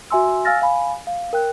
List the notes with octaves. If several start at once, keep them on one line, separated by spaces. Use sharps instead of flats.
F#4 E5 G#5 C6 E6
F5 G#5 E6 F6 A6 A#6
F5 G#5 B5
F5
A#4 G5 F#6